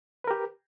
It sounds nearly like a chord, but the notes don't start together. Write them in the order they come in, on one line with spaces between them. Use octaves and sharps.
B4 A#4 G4